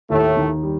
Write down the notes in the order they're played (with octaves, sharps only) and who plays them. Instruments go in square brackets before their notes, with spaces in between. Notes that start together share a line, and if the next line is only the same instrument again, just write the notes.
[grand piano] D#2 [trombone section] A2 A3
[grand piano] D#3
G3